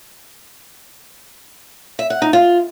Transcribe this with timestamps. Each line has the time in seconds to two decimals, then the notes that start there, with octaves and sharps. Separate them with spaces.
1.99 E5
2.10 F#5
2.22 D#4
2.33 F4